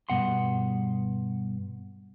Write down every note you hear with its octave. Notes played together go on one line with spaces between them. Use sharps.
G2 B2 F#5 C6